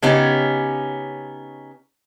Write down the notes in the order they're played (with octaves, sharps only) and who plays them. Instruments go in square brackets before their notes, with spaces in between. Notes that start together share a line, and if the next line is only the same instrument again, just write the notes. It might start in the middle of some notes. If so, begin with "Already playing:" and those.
[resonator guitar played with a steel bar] C#3 B3 C#4 D#4 G4